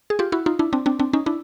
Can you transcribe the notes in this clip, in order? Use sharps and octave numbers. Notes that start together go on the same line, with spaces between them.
G#4
F4 G4
E4 F#4
D#4 F4
D4 E4
C4 D4
C4 D4
C4 D4
C#4 D#4
D4 E4